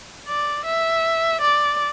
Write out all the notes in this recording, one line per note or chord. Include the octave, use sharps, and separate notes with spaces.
D5
E5
D5